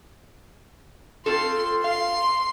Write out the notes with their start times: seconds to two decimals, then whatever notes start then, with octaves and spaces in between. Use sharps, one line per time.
1.26 C4 F4 A4 C6
1.84 F5 C6